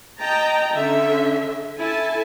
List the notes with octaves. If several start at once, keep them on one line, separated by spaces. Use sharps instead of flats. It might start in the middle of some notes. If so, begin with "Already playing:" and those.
D#5 G5 A5 A#5
D3 C#4 E5
E4 A4 E5 G#5 A5